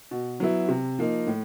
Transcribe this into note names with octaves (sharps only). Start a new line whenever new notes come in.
B2
F#3 B3 E4
C3
F3 A#3 D#4
A2